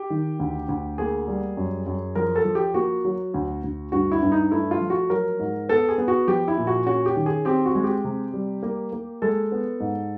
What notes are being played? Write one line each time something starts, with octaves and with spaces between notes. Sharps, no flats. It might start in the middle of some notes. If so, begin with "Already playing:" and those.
Already playing: G4
D#3
D2
D2
A#3 G#4
G3
F#2
F#2
F3 A#4
A4
F3
G4
A#3 F#4
F#3
D2
D2
G2 F#4
E4
G2
D#4
A3 E4
F4
F3
F#4
F#3 A#4
G#2
B3 A4
G#4
B3
F#4
F3 G4
E4
A#2
F#4
C#4 F#4
G4
D#3
G#4
C4 G4
F#4
G#3
G4
C3
G3
A#3
A#3
G#3 A4
B3
G#2